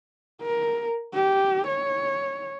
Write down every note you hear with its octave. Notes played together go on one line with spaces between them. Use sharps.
A#4
G4
C#5